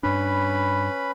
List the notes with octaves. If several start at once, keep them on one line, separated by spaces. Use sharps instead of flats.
G2 C#4 D4 B4 B5